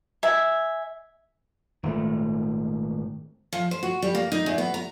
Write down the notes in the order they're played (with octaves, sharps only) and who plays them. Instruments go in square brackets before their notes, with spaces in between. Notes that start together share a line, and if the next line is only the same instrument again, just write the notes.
[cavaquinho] E5 G#5
[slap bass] G#1 A#2 D#3 A3
[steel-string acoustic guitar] F3
C5
F#4
G3
A#3
D#4
E2
B3
A#5